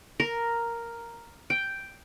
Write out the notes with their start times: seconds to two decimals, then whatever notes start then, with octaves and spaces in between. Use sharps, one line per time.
0.20 A#4
1.50 G5